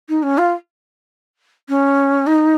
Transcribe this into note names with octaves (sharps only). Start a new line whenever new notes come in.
D#4
C#4
F4
C#4
D#4